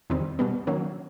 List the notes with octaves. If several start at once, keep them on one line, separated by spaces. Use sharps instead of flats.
E2 C3 D#3 G3 C4
B2 G3 B3
D#3 F#3 A#3 C#4